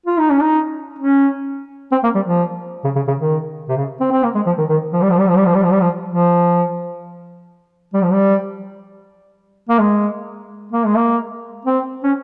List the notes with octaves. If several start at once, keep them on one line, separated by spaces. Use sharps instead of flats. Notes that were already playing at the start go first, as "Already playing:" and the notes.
F4
D#4
C#4
D#4
C#4
C4
A#3
G3
F3
C#3
C#3
C#3
D#3
C3
C#3
C4
C4
A#3
G#3
F3
D#3
D#3
F3
G3
F3
G3
F3
G3
F3
G3
F3
G3
F3
F3
G3
F3
G3
A#3
G#3
A#3
G#3
A#3
C4
C#4